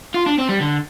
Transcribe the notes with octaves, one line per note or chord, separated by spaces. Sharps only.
F4
D4
C4
G3
D3